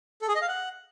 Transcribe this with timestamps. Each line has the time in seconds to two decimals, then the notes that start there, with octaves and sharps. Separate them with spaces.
0.22 A4
0.28 G#4
0.35 D#5
0.42 F5
0.48 F#5